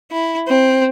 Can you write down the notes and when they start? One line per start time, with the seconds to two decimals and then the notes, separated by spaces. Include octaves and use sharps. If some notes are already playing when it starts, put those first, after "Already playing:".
0.11 E4
0.49 C4